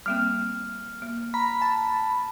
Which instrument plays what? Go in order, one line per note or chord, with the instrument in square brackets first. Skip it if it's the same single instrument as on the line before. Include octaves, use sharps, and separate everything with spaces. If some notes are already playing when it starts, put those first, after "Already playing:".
[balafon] G3 A#3 C4 [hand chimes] F6
[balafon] A#3
[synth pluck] A#5 [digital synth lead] B5
[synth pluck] A5